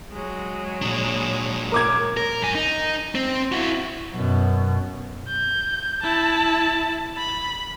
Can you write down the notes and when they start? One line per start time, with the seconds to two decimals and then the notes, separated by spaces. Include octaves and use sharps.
0.12 F#3 G#3
0.82 A#2 D4
1.72 A#4 D6 G#6
2.17 A#4
2.42 F#2 G#5
2.55 D#4
3.15 C4
3.52 E4 F#4
4.14 F#2 B2
5.28 G6
6.03 E4 A5
7.17 B5